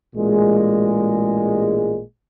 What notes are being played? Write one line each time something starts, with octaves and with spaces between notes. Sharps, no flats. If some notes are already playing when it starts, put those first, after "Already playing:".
A1 A#2 G#3